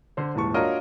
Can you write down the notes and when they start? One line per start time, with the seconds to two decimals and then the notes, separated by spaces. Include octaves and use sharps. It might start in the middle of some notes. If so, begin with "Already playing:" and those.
0.17 D3 C5
0.35 D#1 G#2 E3 A5 C#6
0.54 D4 F4 F#4 A#4 C#5 D#5